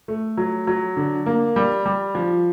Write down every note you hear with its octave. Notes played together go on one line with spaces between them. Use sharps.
A3
F#3
F#3
D3
A#3
G3
G3
F3